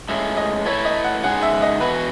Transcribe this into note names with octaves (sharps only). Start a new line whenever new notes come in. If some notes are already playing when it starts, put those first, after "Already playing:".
A2 G#3 C#4 E5
D#5
A3 E4 B4 C#5
D#5
F#5
C#3 G#3 D#4 G#4 F#5
E5
D#5
E3 B3 F#4 B4